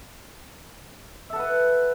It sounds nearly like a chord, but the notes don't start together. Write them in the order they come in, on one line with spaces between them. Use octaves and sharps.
E5 A4 F#5 B4